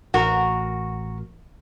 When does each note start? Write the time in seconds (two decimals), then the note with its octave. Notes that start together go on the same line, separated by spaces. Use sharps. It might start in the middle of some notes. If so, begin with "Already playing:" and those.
0.14 A1 F#4 A#4